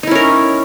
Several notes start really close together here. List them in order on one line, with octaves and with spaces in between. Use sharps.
D#4 E4 C#4 A#4